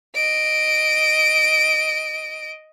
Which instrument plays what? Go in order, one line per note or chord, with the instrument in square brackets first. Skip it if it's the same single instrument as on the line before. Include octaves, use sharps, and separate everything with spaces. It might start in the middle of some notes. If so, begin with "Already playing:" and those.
[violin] D#5 D7